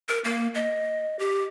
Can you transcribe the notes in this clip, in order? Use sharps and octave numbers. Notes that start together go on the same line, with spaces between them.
A#4
A#3
D#5
G4